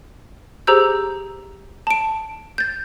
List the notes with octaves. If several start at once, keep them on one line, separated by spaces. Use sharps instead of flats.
G4 G#4 C5 A#5 E6 G6
A5 D7
G6 A6